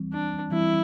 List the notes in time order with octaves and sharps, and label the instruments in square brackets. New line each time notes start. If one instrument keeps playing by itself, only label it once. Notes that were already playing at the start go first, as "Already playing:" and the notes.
Already playing: [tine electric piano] E3 G3 C4
[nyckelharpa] D4
[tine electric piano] E3 G3 C4 [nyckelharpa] E4